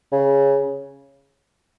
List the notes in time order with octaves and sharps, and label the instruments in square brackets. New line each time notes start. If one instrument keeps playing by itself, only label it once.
[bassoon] C#3